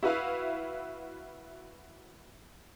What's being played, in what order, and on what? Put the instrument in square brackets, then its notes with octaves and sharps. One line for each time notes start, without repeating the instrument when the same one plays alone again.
[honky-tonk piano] E4 F#4 B4 E5 F5